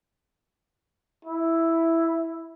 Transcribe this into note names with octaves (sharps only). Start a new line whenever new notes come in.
E4